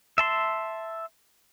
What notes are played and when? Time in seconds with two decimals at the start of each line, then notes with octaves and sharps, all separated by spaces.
0.18 E5 A5 C6